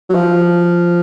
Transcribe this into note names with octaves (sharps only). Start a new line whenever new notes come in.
F#3
F3